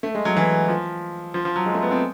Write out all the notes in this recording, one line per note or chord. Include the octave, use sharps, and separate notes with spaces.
A3
G#3
F#3
E3
F3
F3
F3
F#3
G#3
A3
B3
C4